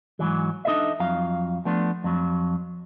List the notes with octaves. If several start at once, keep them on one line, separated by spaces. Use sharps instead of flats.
G#2 C3 E3 F#3
D4 D#4 F4 A4 D#5 E5
F2 F#3 F4 F5
F3 A3 B3 D4
F2 F#3